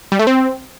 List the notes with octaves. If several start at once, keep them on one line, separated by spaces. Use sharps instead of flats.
G3
A3
C4